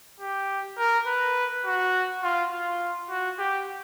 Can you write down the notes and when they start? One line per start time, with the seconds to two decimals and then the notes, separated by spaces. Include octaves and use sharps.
0.20 G4
0.78 A#4
1.07 B4
1.65 F#4
2.23 F4
2.52 F4
3.10 F#4
3.39 G4